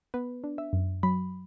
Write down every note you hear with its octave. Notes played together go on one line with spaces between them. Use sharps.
B3 B4
D4
E5
F#2
F#3 B5